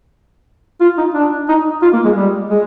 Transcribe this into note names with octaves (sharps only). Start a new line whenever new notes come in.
F4
D#4
D4
D#4
F4
A#3
G#3
G3
G#3